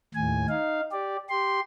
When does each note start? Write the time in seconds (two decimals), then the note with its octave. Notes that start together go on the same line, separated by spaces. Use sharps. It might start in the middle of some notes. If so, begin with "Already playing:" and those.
0.14 D#2 A2 G#5
0.49 D#4 F5
0.92 G4 D5
1.29 G4 C6